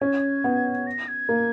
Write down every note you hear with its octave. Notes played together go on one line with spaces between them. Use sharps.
C#4 G#6
B3
A#6
G#6
A#3